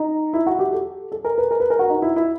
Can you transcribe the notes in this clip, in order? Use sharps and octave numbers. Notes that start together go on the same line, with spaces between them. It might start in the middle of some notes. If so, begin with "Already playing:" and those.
Already playing: D#4
E4
F#4
G4
A4
A4
A#4
B4
A#4
B4
A#4
F#4
D#4
E4
E4